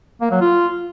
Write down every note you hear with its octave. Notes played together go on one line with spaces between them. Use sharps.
A#3
F#3
F4